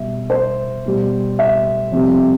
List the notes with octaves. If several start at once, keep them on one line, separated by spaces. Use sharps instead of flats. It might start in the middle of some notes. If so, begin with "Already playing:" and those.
Already playing: B2 G3 E5
C5
B2 G3
E5
F2 C3 G3